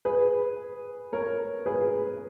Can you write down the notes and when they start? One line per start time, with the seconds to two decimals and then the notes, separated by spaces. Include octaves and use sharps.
0.05 G#4 B4
1.12 A#4 C#5
1.66 G#4 B4